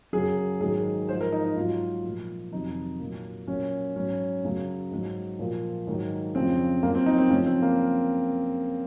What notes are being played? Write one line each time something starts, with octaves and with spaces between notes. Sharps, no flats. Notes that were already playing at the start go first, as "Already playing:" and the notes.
F#2 C#3 F#3 G#4
G#2 D#3 F#3 G#4
G#2 F3 C5
A#4
D#4
D#4
G#2 F#3 F4
A#2 F3
F2 C3 D#3 F#3 D#4
A#2 F#3
A#2 F#3 C#4
G#2 F#3 C#4
F#2 C#3 F#3
G#2 F#3
A#2 F3
G#2 D#3 F#3
F2 C#3 F3 C4
F#2 F3 A#3
C4
D#4
C4
F#2 C#3 F3 C#4
C4
A#3